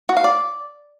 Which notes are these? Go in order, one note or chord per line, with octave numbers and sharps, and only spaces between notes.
F#4
F5
D5